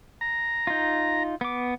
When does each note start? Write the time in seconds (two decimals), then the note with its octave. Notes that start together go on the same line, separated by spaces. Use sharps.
0.21 A#5
0.67 D#4 F4
1.41 B3 D6